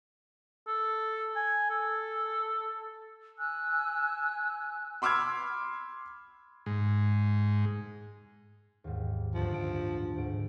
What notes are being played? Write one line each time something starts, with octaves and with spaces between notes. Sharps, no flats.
A4
G#5
A4
G#5 E6 F#6
B5 C6 D6 E6 F6 G#6
G#2
D#2 G#2
A1 D2 G2 F3
E6 G6 D7
D2 G#2 D7